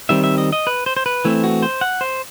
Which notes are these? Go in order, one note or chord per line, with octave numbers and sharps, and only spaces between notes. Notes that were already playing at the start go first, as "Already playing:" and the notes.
D#3 G3 C4 E5
E5
D#5
D#5
B4
C5
C5
B4
E3 A3 C4 E4
F#4
C5
F#5
C5